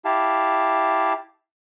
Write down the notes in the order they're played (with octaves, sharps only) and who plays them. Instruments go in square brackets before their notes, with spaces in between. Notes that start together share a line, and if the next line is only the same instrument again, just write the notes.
[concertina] E4 G4 F5 A5